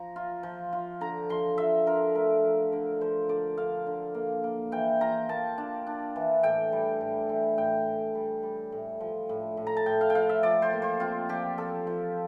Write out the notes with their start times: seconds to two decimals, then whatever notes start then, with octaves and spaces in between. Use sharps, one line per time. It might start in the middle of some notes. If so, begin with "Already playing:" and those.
Already playing: F3 A#5
0.16 F4
0.43 F3
0.73 F4
1.01 D3 A#5
1.29 F3 C6
1.57 F4 E5
1.86 D3 A#4
2.15 A3 A#4
2.44 F3
2.73 D3
3.01 F3 C5
3.29 D3 D5
3.57 D3 F5
3.86 D3
4.15 A#3
4.44 A#3
4.72 E3 G5
5.01 F4 A#5
5.29 A#3 A5
5.58 D4
5.87 D4
6.16 E3
6.43 A2 G5
6.72 G3
7.01 A2
7.29 E3
7.58 A2 G5
7.87 A2
8.15 G3
8.43 G3
8.72 A2
9.00 F3
9.29 A2
9.57 A2
9.67 A#5
9.77 A5
9.86 A2 G5
10.01 F5
10.10 G5
10.15 F3 F5
10.29 E5
10.43 F3 D5
10.62 C5
10.72 A#3
10.82 C5
11.00 C4 F4
11.29 F3 G4
11.58 F3 A4
11.87 F3